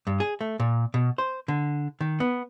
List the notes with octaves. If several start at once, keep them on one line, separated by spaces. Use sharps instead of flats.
G2
G#4
A3
A#2
B2
C5
D3
D#3
B3